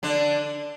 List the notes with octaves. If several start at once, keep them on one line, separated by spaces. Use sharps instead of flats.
D3 D4